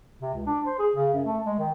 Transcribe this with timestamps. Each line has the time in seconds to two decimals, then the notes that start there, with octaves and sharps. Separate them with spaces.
0.22 C3
0.34 C#2
0.46 D4
0.66 C5
0.79 G#4
0.95 C#3
1.14 F#2
1.26 A3
1.46 G#3
1.59 D#3